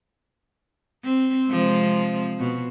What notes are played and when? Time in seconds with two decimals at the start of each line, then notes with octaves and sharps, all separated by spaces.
1.04 C4
1.49 C3 F3 G#3
2.40 B2